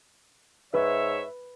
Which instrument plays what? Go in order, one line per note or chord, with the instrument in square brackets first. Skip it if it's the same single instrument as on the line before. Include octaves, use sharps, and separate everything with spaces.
[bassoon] G#2 [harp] B4 [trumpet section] C#5 E5